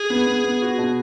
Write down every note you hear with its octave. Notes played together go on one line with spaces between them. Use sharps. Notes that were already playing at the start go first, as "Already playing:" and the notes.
Already playing: G#4
B3
B3
B3
F#4
B2